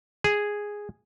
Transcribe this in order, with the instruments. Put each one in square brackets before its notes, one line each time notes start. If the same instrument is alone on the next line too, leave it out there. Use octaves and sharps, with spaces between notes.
[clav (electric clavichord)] G#4